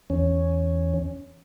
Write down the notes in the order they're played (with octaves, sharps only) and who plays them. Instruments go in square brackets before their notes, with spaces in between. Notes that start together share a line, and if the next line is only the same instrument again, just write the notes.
[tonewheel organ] E2 C#4